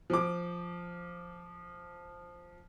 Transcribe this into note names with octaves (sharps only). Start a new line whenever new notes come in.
F3 D6